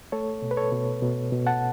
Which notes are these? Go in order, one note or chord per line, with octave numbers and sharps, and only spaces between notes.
A3 A4 C#5
B2
B4
A4 C#5
B2
B2
B2
F#5 A5